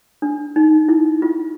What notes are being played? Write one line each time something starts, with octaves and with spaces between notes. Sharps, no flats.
D4
D#4
E4
F4